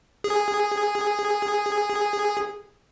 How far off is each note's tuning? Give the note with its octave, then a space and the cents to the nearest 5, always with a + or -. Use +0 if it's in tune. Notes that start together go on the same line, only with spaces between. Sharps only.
G#4 -10